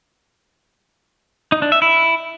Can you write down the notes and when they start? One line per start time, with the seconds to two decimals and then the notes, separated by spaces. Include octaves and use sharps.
1.52 D#4
1.62 D4
1.72 E5
1.82 E4